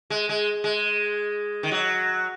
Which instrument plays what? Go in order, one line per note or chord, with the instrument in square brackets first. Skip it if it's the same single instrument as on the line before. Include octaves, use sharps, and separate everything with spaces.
[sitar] G#3
G#3
G#3
D#3
F#3